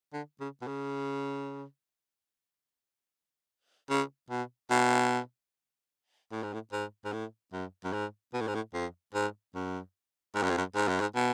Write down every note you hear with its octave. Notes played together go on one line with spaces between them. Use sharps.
D3
C#3
B2
C#3
C#3
B2
B2
A2
G#2
A2
G#2
G#2
A2
F#2
F#2
G#2
B2
A2
G#2
A2
F2
G#2
F#2
G#2
F#2
F2
F#2
G#2
F#2
G#2
B2